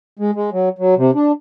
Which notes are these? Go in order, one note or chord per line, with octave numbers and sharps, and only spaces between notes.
G#3
G#3
F#3
F#3
C3
D4